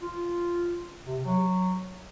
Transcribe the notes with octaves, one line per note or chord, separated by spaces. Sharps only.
F4
C3
F#3